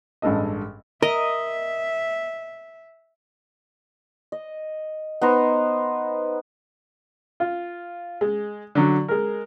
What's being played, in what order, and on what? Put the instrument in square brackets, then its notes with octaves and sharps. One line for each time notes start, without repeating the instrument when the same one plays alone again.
[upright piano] A1 G2 G#3 A4 D#5
[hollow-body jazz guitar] A#4 [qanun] D#5 [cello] E5
[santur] D#5
B3 D#4 C5 A#5
[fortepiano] F4
G#3
D3 F#3 D4
G#3 A#4